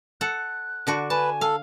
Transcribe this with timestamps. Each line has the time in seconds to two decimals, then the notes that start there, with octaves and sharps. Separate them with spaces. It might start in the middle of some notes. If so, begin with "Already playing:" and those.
0.21 A4 F#5 F#6
0.87 D3 D4 F#4
1.10 B4 G#5 A5
1.41 A4 F5